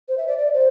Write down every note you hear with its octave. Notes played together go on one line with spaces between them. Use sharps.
C5
E5
D5
D5
C5